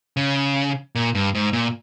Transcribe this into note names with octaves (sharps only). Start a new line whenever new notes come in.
C#3
A#2
G2
G#2
A#2